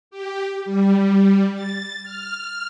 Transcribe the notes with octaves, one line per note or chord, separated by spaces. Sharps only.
G4
G3
A6
F6